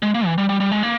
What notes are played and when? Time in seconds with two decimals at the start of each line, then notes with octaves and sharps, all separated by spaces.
0.03 G#3
0.15 A#3
0.26 E3
0.38 G3
0.49 G3
0.60 G3
0.72 G#3
0.83 A#3